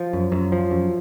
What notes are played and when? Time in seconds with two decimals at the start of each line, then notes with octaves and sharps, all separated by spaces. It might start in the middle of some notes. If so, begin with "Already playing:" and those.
Already playing: F3
0.13 F#2
0.32 F#2
0.52 F3
0.71 F#2